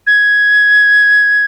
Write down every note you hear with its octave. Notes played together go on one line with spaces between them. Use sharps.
G#6